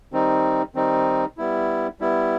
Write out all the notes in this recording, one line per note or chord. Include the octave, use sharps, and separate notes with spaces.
D#3 G3 C4 D#4
D#3 G3 C4 D#4
G3 B3 E4
G3 B3 E4